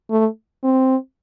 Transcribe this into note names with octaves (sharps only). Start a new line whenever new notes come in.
A3
C4